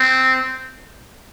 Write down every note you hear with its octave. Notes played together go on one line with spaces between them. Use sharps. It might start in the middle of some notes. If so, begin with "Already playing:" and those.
Already playing: C4